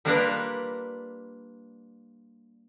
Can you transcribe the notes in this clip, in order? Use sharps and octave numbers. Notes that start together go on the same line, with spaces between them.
G3 A#3 D4 F4 A#4 B4